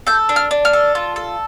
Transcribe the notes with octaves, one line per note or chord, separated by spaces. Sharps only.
A4 G6
D4
F6
D4
F6
A4
F4
A4